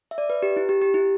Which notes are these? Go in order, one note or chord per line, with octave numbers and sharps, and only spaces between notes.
E5
D5
B4
G4
E4
G4
G4
E4